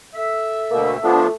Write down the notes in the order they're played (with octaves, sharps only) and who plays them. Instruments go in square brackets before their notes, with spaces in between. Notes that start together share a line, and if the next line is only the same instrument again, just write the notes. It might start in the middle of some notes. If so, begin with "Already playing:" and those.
[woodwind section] A4 E5
[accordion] D2 B2 [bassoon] A#3
[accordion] F3 B3 D4 [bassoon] A3 [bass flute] F4